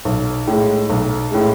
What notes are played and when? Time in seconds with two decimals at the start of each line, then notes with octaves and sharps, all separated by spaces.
0.05 B1
0.47 A2 G#3
0.90 B1
1.31 A2 G#3